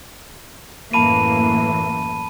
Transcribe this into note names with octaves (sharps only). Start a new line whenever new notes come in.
F#2 A2 E3 A#3 A5 B5 D#7